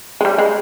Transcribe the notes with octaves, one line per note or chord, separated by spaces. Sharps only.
G#3
G3
G#3